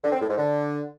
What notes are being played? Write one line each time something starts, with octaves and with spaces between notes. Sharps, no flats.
D3
C4
A2
G#2
D3